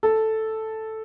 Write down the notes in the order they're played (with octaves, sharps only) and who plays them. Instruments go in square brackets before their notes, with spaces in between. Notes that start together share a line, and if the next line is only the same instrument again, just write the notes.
[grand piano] A4